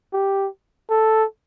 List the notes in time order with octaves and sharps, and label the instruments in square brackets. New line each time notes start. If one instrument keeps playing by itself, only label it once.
[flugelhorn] G4
A4